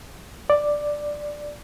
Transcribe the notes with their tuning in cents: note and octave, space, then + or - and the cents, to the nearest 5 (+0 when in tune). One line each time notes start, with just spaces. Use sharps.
D5 +5